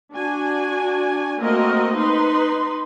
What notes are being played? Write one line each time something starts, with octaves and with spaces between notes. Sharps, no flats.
D4 F#4 G#5
A3 A#3 C4 F#4 A#4 D#5
D#4 B4 C6